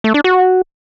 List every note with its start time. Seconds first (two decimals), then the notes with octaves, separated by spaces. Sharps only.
0.04 A3
0.14 D4
0.24 F#4